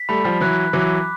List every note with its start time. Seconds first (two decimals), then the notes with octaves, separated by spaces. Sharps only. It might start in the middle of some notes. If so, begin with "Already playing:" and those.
Already playing: B6
0.09 G3 A3 B5
0.24 F3 G3
0.41 E3 F#3 F#6
0.73 E3 F#3 D6